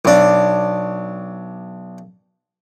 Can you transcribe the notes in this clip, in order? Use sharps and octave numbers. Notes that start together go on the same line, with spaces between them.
B1 D4